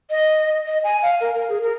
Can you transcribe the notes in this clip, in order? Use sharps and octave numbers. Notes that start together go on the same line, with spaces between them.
D#5
D#5
G#5
F5
A#4
A#4
G#4
A#4